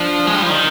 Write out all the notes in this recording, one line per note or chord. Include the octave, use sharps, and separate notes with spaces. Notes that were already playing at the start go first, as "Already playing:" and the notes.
Already playing: F3 D4
G#3
G3
F3
D#3